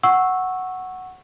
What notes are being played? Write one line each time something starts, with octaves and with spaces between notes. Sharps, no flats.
F#5 C#6 E6